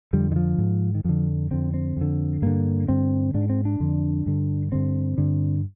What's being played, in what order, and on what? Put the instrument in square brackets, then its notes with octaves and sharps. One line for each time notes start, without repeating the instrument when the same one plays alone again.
[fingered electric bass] F2 D3 G3
D#3
F3
G#2
D#3
F2 D3 F3
F2 D3 C4
C4
F2 D3
G2 D3 A#3
G2 D3 C4
G#2 D4
C4
D4
F2 D3
G2 D3
G2 D3 C4
G2 D3